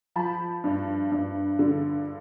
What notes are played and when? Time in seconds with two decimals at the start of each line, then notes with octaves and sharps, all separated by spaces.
0.16 F3 A5 B5
0.64 G2
1.11 G2
1.59 D3